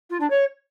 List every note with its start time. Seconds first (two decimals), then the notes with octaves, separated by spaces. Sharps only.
0.10 F4
0.20 D4
0.30 C#5